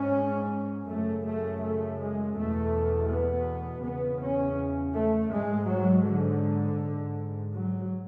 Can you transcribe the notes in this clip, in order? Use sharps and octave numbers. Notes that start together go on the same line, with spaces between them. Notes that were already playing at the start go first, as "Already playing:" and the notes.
Already playing: G#2 C#4
F#2 C#3 A3
A3
A3
G#3
E2 B2 A3
B3
E2 C#3 B3
C#4
A3
G#2 G#3
F#3
D3
G#2
F#3